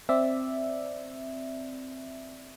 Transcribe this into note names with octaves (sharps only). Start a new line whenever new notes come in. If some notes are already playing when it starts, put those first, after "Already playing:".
C4 D5 E5